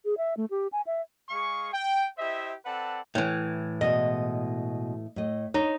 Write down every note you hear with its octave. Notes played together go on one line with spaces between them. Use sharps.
G#4
E5
A3
G4
G#5
E5
G#3 G#4 F5 C#6
G5
E4 G4 C5 D#5 E5
C4 A4 B4 D5 F#5 A5
A2 E3
B2 G#3 D#5
A2 D#5
D#4 C#5